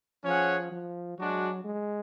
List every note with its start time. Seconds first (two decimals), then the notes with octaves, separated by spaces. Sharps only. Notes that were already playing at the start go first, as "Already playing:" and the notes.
0.24 F3 C#4 G#4 C#5 F#5
0.72 F3
1.18 F#3 G#3 D4 F#4
1.65 G#3